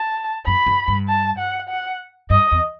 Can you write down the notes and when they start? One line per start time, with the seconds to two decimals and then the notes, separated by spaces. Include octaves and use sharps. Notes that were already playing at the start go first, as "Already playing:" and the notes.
Already playing: A5
0.46 F#2 B5
0.66 F#2
0.88 G2
1.08 A5
1.38 F#5
1.69 F#5
2.30 G2 D#5
2.52 E2